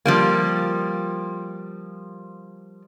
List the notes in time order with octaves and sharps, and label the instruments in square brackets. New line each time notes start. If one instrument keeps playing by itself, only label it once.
[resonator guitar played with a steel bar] F3 G3 A#3